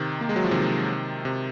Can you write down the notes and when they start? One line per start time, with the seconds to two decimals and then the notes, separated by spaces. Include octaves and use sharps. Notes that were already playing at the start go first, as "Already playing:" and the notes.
Already playing: C3 D#3
0.21 A#3
0.29 G#3
0.36 F#3
0.44 F3
0.51 C3 D#3
1.25 C3